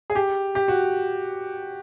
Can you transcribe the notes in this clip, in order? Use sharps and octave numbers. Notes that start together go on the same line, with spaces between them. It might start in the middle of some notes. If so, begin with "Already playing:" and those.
G#4
G4
G4
F#4